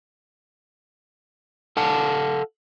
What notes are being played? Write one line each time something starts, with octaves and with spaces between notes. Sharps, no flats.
A4 F5 F#5 A5